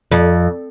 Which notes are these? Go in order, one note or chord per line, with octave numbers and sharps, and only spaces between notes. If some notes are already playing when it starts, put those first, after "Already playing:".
F2